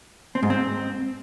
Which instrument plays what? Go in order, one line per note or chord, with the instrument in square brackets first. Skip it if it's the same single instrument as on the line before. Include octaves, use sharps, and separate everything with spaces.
[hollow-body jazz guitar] C4
G#2
C4